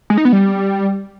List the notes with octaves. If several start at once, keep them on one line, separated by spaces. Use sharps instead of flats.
G#3
D#4
B3
G3